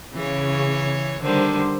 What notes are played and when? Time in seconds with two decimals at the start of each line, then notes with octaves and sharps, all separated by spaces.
0.14 C#3 E3 C#5
1.21 D3 D#3 G3 C5